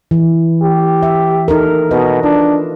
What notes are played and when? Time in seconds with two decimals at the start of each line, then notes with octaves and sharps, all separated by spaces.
0.11 E3
0.62 G4
1.03 E5
1.48 D#4 A4 A#4
1.91 B2 B4 D#5
2.23 D4 F4